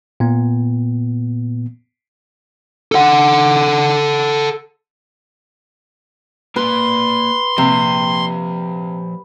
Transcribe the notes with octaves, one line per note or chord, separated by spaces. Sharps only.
A#2 B3
A4 F#5
A#3 B4 D5 C6
C3 F3 A#3